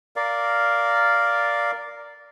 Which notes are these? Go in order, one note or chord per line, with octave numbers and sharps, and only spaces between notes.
A#4 D5 F5